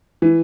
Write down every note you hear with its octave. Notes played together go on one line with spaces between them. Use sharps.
E3